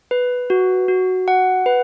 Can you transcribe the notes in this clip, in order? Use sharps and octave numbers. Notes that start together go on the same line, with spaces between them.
B4
F#4
F#4
F#5
B4